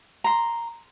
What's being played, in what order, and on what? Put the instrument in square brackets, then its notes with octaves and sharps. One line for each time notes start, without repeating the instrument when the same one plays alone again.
[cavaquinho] A#5 C6